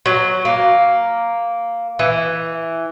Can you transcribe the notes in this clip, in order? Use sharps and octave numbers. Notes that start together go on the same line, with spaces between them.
F#3
A#3
E3